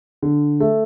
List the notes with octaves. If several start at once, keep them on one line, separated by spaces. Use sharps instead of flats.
D3
A3